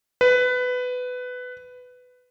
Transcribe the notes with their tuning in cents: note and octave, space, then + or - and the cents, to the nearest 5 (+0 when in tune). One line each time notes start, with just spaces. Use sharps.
B4 +15